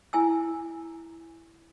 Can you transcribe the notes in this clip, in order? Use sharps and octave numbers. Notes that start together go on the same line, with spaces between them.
E4 G#5 E6